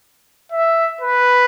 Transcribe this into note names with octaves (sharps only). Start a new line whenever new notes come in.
E5
B4